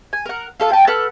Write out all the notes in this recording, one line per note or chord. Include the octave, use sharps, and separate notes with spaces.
G#5
A#4 F#5
F4 A4 F5
G5 A5
A4 B4 F#5 F6